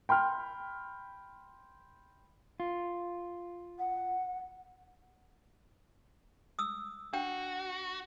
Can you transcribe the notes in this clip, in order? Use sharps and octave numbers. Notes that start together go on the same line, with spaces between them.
G5 B5 C6 F6
F4
F#5
D#6 E6
D4 F#4 G5